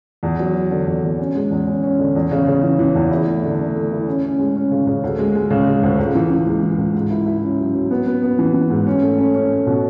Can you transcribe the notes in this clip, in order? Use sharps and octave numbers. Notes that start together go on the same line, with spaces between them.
E2
F#3
F#3
D3
E2
E2
C#4
G#3
E2
C#4
C#4
D3
E2
C#3
C#3
E3
E3
E2
E4
A3
D3
A3
A3
E4
C#4
C#4
G#3
C#4
C#3
C#3
D2
G#3
G#3
C#3
G#3
D2
C#2
E3
E3
G#3
E3
C#2
G#2
E4
E4
C#4
F#3
F#3
B3
B3
B3
E3
E3
G#2
C#4
A3
C#4
C#4
A3
B2